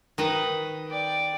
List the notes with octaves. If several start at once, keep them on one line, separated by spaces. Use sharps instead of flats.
D#3 B4 D#5
D5 G5